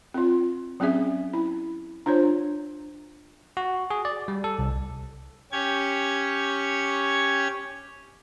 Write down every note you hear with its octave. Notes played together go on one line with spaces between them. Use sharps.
C4 F4
F#3 C4 C#4 G#4 E5
E4
D4 F4 C5 C#5
F#4
G#4
D5
G3
A4
C2
C#4 G4 C#5 G#6